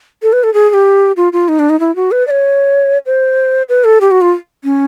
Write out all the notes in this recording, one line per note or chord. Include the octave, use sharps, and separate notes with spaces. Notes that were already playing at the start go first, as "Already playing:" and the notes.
A4
B4
A4
G#4
G#4
G4
F4
F4
D#4
D4
D#4
E4
F#4
B4
D5
C#5
C5
B4
A4
G4
F#4
F4
C#4